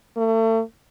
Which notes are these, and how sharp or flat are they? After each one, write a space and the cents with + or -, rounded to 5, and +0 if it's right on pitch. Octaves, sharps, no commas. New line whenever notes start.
A3 +35